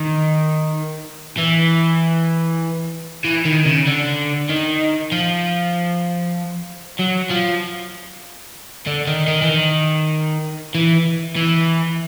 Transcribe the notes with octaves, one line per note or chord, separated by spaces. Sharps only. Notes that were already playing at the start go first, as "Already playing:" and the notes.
Already playing: D#3
E3
E3
D#3
C#3
D3
D#3
F3
F#3
F3
D3
D#3
D#3
E3
D#3
E3
E3